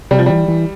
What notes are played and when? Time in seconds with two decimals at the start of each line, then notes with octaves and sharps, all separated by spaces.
0.11 C3 G3
0.19 F3
0.26 E3 G3
0.48 E3